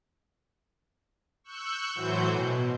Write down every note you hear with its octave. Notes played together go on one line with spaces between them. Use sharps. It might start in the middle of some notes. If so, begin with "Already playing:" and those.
C#6 E6 F#6 G6
A2 E3 F#3 F#4 C5 G6
B2